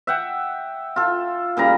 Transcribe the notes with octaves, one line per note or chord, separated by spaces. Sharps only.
E5 F#5 G5
F4 A4
A#2 C#3 G3 A#5